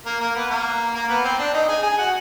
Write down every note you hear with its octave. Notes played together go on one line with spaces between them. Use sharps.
A#3 A#4
A#3 A#4
B3 B4
A#3 A#4
A#3 A#4
B3 B4
C4 C5
D4 D5
D#4 D#5
G#4 G#5
G#4 G#5
F#4 F#5